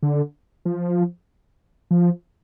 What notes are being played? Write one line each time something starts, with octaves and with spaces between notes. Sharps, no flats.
D3
F3
F3